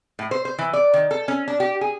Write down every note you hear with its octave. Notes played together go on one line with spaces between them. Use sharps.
A2
C5
C5
E3
D5
D#3
A4
C#4
D4
G4
G#4